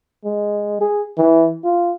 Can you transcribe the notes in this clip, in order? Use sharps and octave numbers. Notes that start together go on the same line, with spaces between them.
G#3
G#4
E3
F4